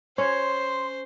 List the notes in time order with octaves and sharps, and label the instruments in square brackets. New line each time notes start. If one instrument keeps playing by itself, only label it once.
[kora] C#4 [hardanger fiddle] C5 [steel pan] C#5 [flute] C6